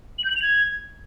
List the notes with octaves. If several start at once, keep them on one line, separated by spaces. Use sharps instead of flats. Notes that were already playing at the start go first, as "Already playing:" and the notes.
F#7
G6
F#7
F7
G#6